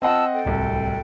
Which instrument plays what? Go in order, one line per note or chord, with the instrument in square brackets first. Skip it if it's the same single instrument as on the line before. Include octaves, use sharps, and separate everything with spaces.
[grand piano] C4 D#5 F#5 [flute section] F4 A5 E6
[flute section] A4 G5
[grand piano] D1 C2